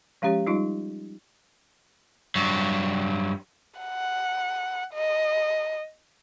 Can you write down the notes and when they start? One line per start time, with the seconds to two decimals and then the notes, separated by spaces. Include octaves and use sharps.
0.22 F3 G#3 C#4 G4 C#5
0.46 G3 D#4 F4
2.35 G2 F#3
3.80 F#5
4.94 D#5